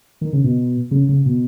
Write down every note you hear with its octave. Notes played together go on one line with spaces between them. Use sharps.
D#3
C#3
B2
C#3
C#3
B2